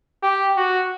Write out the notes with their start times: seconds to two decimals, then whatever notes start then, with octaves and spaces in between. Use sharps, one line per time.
0.23 G4
0.57 F#4